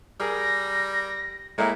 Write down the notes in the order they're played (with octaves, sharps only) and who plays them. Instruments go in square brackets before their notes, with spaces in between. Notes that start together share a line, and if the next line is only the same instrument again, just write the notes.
[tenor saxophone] G3 [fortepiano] G#4 A#4 [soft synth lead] A#6
[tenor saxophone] A2 [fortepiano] G#3 A#3 E4 [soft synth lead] A#5